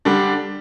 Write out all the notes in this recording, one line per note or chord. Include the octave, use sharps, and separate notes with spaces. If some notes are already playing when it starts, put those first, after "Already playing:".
D3 G3 D4